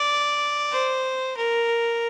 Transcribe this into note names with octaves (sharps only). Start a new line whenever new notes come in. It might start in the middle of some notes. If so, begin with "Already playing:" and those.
Already playing: D5
C5
A#4